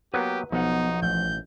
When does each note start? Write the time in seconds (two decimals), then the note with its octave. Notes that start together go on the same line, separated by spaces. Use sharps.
0.14 F#3 A#3 B3 G4 B4
0.52 B1 F3 B3 D#4 F#5
1.02 A1 G6